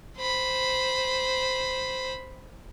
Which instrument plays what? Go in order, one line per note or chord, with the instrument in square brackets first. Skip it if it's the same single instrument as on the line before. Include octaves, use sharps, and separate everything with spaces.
[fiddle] C5 B5